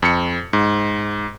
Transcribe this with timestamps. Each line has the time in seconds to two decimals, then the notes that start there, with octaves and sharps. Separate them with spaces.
0.02 F2 C#7
0.53 G#2